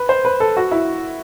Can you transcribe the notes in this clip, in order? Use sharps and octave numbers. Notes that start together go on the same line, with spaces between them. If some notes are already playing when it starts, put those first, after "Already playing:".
Already playing: B4
C5
B4
A4
F#4
E4